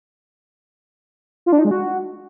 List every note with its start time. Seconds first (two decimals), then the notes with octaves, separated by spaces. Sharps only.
1.46 F4
1.53 D4
1.59 D#4
1.65 G#3
1.71 F#4